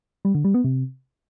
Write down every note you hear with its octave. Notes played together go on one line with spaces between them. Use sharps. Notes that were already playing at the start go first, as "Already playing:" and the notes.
G3
D3
G3
B3
C3